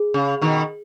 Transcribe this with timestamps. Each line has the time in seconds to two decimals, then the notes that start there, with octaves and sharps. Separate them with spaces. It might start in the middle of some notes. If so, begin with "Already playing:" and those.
Already playing: G#4
0.14 C#3
0.41 B2 D#3